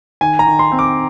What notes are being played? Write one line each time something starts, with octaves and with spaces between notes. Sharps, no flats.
D#3 G#5
A#5
D#3
C6
C4
D6